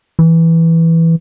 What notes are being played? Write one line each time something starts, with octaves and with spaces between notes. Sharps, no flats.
E3